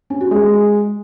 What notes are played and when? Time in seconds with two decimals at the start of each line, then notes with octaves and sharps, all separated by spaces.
0.10 C#4
0.21 F#4
0.31 G#3